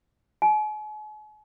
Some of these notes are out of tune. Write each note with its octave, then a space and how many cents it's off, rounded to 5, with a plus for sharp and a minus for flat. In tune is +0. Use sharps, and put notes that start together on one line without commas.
G#5 +45